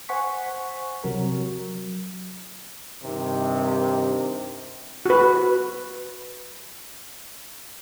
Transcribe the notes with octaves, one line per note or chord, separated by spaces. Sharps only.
C5 F#5 G#5 C#6 B6
C3 F#3 A#4
F#3
G2 C3 D#3
F#4 B4